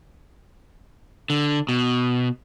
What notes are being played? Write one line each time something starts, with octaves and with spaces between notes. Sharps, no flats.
D3
B2